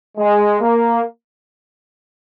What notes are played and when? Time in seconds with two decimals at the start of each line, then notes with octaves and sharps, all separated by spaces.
0.18 G#3
0.61 A#3